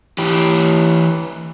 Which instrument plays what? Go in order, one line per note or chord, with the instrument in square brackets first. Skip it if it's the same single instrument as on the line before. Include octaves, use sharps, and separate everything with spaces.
[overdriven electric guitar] E3 G4